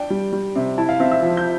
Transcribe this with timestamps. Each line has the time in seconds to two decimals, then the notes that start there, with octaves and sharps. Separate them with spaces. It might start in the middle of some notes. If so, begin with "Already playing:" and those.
Already playing: D4 G5
0.10 G3
0.33 G3
0.56 C3
0.78 E4 A5
0.89 F5
1.00 C4 E5
1.12 E5
1.23 F3
1.37 G6